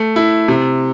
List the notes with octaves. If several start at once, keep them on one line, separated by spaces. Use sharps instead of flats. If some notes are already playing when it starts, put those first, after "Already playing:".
Already playing: A3
E4
C3